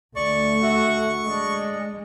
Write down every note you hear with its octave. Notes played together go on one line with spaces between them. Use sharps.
D2 A3 D5 C#6
F#4 E5
G#3 D4 D#5